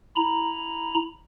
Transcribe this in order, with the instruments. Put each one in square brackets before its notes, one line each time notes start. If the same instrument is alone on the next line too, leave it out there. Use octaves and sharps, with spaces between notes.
[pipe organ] E4 A#5 B5